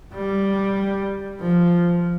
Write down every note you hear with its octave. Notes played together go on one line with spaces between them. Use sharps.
G3
F3